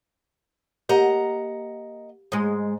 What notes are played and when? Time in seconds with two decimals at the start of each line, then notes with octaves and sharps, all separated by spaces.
0.89 A#3 G4 D#5 F#5 A#5
2.32 G#2 G#3 D#5